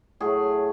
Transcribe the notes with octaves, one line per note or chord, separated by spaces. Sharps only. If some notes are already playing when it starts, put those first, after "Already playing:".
A2 F#3 A3 G#4